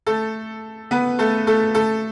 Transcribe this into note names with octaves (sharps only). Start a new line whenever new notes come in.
A3 A4
B3 B4
A3 A4
A3 A4
A3 A4